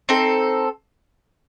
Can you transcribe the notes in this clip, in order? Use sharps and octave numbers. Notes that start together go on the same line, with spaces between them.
C4 D#4 A4